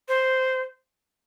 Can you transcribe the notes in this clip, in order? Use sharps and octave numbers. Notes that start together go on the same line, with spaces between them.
C5